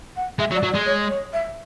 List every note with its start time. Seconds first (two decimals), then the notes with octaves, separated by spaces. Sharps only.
0.16 F#5
0.39 G#3 E5
0.51 F#3
0.55 D5
0.63 F#3
0.71 D5
0.75 G#3
0.86 C#5
1.09 C#5
1.33 E5